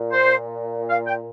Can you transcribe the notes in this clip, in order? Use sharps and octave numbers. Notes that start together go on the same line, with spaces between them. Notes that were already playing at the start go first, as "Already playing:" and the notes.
Already playing: A#2
C5
F5
G5